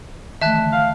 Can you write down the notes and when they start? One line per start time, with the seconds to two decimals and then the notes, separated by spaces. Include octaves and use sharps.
0.41 D#3 E3 A3 E5 A5 F#6
0.58 D3
0.73 F5